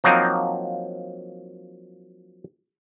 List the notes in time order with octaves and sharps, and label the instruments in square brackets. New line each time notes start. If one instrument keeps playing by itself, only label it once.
[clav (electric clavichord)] F3 F#3 A#3 C4 D#4